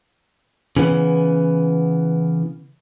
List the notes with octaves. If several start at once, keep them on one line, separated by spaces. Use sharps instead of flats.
C#3 E3 B3